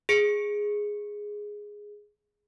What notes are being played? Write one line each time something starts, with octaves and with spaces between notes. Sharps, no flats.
G#4 C#7